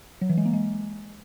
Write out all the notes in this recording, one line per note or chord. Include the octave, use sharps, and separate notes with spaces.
F#3
E3
G#3
A#3
G#3